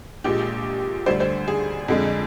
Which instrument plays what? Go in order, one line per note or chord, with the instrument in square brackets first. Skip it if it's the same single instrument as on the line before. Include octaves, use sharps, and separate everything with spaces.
[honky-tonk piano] A#1 A#2 G#3 G4
D2 D3 G3 C5
C5
G#4
F2 D3 G#3